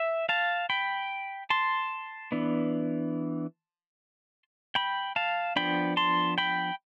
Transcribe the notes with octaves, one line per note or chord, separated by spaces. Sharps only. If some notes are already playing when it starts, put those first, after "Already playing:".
Already playing: E5
F5 A5
G5 B5
A5 C6
E3 B3 D4
G5 B5
F5 A5
F3 B3 D4 G5 B5
A5 C6
G5 B5